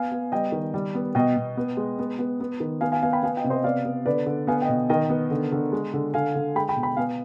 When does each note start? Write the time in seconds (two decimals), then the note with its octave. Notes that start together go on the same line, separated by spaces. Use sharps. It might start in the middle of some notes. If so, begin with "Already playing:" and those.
Already playing: B3 F5 G#5
0.11 B3
0.32 G3 D#5 G5
0.52 D#3
0.74 G3
0.95 B3
1.15 B2 D#5 G5
1.37 B2
1.57 B3
1.77 G#3
1.99 B3
2.19 B3
2.40 B3
2.60 D#3
2.81 B3 F5 G#5
2.92 F5 G#5
3.02 B3 F5 G#5
3.13 G5 B5
3.23 B3 F5 G#5
3.37 D#5 G5
3.44 C3
3.50 C5 D#5
3.64 B3 D5 F5
3.85 B3
4.06 D3 B4 D5
4.26 D3
4.47 B3 F5 G#5
4.62 D#5 G5
4.69 B2
4.90 D#3 D#5 G5
5.10 B3
5.31 D3
5.52 D3
5.72 G#3
5.94 D3
6.14 D3 F5 G#5
6.35 D3
6.55 G#3 G5 B5
6.69 G5 B5
6.76 B2
6.83 G5 B5
6.97 B3 F5 G#5